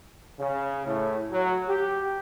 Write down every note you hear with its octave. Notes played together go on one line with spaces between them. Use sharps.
C#3
A2
F#3
G4